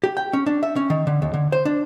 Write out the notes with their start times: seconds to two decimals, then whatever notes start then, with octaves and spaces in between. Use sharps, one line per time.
0.04 G4
0.17 G5
0.33 C#4
0.46 D4
0.63 E5
0.76 C#4
0.90 D#3
1.07 D3
1.22 D#2
1.34 D3
1.52 C5
1.65 D4